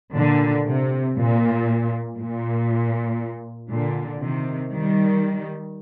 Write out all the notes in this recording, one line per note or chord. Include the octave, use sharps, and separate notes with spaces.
A#2 D3
C3
A#2
A#2
A#2 D3
C3 D#3
D#3 G3